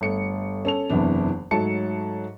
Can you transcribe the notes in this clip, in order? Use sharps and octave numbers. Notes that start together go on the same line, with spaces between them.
G1 A3 C#7
C#4 A4 F7
F#1 E2 C3 E3 D4
G#2 F#3 A3 C#5 A5 C#7